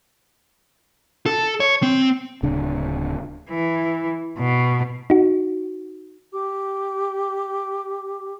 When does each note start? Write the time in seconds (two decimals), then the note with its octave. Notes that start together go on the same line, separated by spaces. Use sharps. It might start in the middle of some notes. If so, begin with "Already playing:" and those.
1.26 A4
1.60 C#5
1.83 C4
2.43 D1 C#3 D4
3.50 E3
4.39 B2
5.10 D#4 F#4
6.33 G4 D6